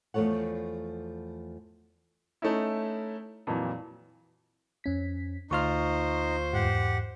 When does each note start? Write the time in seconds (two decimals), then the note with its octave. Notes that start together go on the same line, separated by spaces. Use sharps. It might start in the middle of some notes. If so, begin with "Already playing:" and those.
0.14 E2 F3 A3 A4 C#5 F#5
2.42 A3 C#4 D#4 E4
3.47 F2 A#2 E3 F#3
4.84 F2 C#4 B6
5.51 D2 D#4 F4 C5 C#6 F6
6.53 E2 G#2 G4 F#5